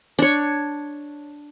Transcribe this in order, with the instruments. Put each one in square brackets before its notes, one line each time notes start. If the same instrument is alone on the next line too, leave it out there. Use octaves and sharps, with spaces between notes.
[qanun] D4 C#5